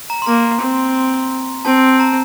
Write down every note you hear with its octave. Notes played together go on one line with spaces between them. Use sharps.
A#5
C6
A#3 A#5
C4
C4 A5
A#5